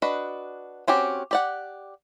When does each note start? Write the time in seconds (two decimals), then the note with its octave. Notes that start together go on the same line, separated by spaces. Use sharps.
0.02 D4 F#4 B4 D#5
0.87 C4 C#4 F#4 G4
1.31 G4 D5 F#5